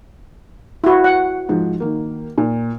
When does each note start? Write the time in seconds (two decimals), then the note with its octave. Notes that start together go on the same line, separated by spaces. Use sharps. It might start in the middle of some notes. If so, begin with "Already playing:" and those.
0.84 E4 F#4
1.04 F#5
1.49 G#2 F3
1.80 D#3 A#3
2.38 A#2